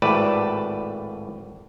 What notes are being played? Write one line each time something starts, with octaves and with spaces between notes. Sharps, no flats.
G#1 A2 A3 B4 D5 A5